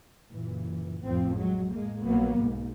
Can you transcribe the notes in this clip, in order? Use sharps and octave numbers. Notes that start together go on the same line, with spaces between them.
F#1 A#2 E3
A1 F2 A2 F3 C4
F#3 G#3
A2 G#3 A#3
A#1 F#3 A#3 B3
B1 G#2